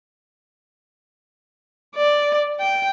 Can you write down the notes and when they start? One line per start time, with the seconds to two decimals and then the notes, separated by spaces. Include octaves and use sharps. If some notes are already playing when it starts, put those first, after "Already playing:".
1.96 D5
2.60 G5